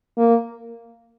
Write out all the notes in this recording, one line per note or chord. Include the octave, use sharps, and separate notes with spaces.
A#3